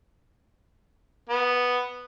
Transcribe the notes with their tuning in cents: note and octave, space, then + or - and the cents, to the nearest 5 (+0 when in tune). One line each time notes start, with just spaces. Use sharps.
B3 +0